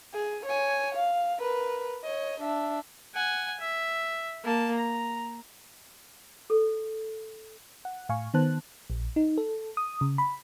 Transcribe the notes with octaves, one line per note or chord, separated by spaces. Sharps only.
G#4
C#5 G#5
F5
A#4 B4
C#5 D#5
D4 E5
F#5 G#5
E5
A#3 A5
A#5
A4
F#5
A2 F5 G#5 C#6
D#3 B3 C5 A5 F#6
A#1
D#4
A4
D#6
C#3
B5